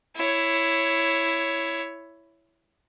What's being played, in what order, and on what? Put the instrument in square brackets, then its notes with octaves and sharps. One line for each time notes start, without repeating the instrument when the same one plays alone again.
[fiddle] E4 C#5